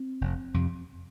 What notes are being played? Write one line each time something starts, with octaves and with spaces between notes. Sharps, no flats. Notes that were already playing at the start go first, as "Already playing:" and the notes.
Already playing: C4
F1
F2 C3